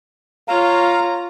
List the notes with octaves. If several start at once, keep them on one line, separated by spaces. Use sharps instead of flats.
F4 C#5 F5 A#5